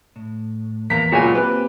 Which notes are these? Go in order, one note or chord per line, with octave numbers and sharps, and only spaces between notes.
A2
E2 A#3 A#5 B6
C#2 A#2 F#3 F#4 C#5 G#5
A#3 C4 G4 B4